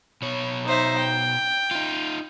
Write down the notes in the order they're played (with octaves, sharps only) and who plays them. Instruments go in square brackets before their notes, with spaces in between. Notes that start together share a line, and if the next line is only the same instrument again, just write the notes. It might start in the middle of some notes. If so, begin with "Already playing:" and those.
[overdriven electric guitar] B2 C#5
[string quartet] D#4 C5 E5
G5
[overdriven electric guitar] D#4 F4